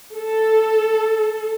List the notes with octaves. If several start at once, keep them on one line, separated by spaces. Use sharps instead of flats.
A4